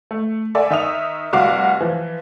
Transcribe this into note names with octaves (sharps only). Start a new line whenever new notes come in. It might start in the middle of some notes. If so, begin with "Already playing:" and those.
A3
A4 D5 E5 F#5 G#5
D#3 E5 D#6 F7
F1 C2 F#4 F5 F#5 D6
E3 F3